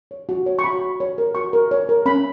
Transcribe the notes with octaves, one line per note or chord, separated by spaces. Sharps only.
C#5
F#4
C#5
C#6
F#4 B5
F#4
C#5
A#4
F#4 C#6
A#4
C#5
A#4
C#4 B5